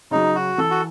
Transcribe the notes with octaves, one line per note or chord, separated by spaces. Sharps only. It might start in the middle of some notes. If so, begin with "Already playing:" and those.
C#3 F#3 D#4
F#4
E3 A4
F#4